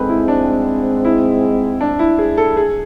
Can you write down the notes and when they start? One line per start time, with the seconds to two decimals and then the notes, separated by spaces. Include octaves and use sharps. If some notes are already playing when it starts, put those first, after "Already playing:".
Already playing: G#2 G#3 C4 A4 B4 C5
0.09 E4
0.28 D4
1.05 E4
1.81 D4
1.99 E4
2.19 G#4
2.38 A4
2.57 G#4